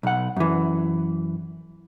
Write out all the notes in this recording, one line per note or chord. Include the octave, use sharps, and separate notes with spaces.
B1 F#5
F#2 E3